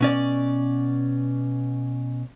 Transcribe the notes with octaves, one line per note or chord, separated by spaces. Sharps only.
B2 C#4 D5